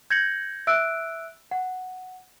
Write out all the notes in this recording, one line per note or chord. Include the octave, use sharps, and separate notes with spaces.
G6 G#6 A#6 C#7 F#7
E5 E6 F#6 D7
F#5